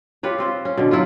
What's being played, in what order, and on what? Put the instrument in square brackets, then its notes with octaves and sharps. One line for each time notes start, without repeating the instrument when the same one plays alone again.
[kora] F4 G4 B4 C#5
C4 F4 C5
C#4
B2 D3
F#3 E4 F4